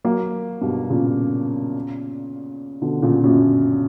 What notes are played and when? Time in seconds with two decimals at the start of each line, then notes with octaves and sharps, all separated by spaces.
0.04 F#3 A#3
0.61 G2 B2
0.90 A#2 C#3
2.82 B2 D3
3.02 A#2 C#3
3.24 F#2 A#2